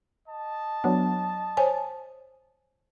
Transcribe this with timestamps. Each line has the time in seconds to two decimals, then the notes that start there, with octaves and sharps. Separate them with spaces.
0.27 D#5 A5
0.84 F#3 B3 D4
1.57 C5 C#5 G#5